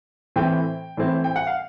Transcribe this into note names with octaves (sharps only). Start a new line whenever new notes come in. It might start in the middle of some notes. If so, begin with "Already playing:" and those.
A2 E3 A3 C4 E4 G5
A2 E3 A3 C4 E4
G5
F#5
F5